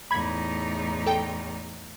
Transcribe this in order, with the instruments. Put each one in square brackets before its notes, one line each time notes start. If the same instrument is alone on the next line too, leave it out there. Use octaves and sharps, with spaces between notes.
[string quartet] E2 A2 D#4 [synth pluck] B5 G#6
[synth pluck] A4 G5